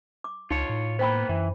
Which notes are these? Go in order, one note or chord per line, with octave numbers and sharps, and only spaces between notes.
D6
C#2 D#4 F4 C#5
A2
A#3 B3 C5 G5 B5
F#2 E3